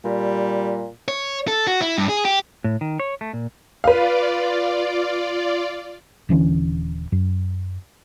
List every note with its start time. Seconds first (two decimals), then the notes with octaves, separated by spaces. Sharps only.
0.05 A#2 G3
1.08 C#5
1.48 A4
1.67 F#4
1.82 E4
1.98 G2
2.09 G#4
2.25 G4
2.64 A2
2.81 D#3
3.00 C#5
3.21 A3
3.33 A#2
3.84 F4 B4 D5 F5
6.29 D#1 D3 E3 C#4
7.12 F#2